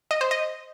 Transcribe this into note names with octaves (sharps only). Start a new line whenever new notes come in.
D#5
C5
D#5